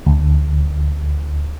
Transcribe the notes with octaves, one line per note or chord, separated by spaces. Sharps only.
D2